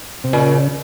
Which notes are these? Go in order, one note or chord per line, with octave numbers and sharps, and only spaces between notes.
C3
A#2 C#3